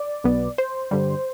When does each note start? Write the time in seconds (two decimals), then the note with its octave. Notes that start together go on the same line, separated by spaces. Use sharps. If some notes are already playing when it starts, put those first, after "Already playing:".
Already playing: D5
0.24 B1 B2 B3
0.58 C5
0.91 G2 D3 G3